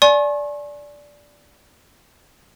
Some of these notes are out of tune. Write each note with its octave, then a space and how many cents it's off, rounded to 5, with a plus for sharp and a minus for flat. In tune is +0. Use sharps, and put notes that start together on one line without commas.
D5 -10 G#5 +30 C#6 -40